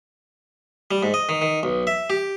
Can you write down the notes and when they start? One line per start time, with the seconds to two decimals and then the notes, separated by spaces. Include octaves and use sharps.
0.91 G3
1.03 G#2
1.14 D#5
1.29 D#3
1.42 D#3
1.63 B1
1.87 E5
2.10 G4